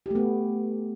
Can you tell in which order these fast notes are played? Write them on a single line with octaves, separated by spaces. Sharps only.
G4 A3 B3